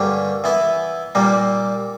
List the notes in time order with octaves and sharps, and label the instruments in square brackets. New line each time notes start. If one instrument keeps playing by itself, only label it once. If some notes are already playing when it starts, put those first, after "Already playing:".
Already playing: [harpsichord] G2 D3 A#3 C#4 G4
E3 B3 E4
A#2 G3 A#3